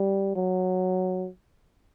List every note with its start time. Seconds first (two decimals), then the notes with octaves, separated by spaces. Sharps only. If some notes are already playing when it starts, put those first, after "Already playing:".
Already playing: G3
0.35 F#3